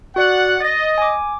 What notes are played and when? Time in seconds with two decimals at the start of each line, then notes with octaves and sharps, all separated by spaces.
0.16 F#4 D5 F#5
0.60 D#5 A6 A#6
0.98 G#5 D6